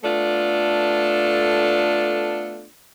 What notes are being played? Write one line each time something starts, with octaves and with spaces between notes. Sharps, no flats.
A3 B3 D4 F4 A4